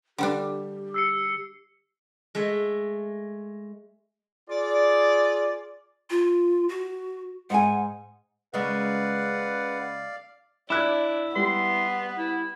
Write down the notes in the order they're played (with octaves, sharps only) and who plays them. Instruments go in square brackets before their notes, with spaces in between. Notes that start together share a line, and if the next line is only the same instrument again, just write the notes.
[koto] D3 G3 D4 [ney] G4
[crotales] E6 C7 C#7
[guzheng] G#3 A3 E5
[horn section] F4 G#4 D5
[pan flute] F4
F#4
[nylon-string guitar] G#2 G#5 [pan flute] F#5
[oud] C#3 G#3 A#3 [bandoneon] B4 F#5 [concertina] D5 F5
[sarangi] D4 [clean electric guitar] E4 [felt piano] D6 F#6 G#6
[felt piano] G3 [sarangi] B3 [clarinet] C6
[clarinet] E4